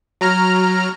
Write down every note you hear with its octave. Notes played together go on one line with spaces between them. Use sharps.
F#3 A#5 F6